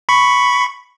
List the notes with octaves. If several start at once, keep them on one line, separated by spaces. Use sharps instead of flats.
B5 C#6